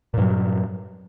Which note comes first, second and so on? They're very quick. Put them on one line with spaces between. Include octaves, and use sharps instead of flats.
A#2 G2 F#3